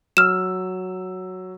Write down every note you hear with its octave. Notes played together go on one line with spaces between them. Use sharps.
F#3 E6 F6 E7